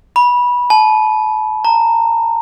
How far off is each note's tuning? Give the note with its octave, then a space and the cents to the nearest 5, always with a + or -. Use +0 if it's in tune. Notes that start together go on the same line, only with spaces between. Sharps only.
B5 -20
A5 -30
A#5 -25